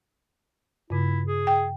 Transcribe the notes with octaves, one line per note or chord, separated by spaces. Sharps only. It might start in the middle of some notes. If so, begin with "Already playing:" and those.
G2 C#3 E4
G#4
G5